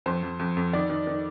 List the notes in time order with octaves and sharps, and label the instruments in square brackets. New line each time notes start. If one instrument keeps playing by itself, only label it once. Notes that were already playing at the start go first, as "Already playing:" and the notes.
[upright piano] F2 C5
F2
F2
F2
D#3 D5
D#3
D#3